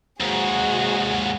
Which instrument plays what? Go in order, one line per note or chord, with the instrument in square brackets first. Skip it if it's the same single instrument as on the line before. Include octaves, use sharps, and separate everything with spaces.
[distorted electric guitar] D#2 G#2 [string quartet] F#4 G#4